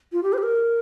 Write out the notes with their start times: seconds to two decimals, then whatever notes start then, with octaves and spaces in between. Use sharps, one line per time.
0.13 F4
0.23 G4
0.33 C5
0.38 G4
0.43 A#4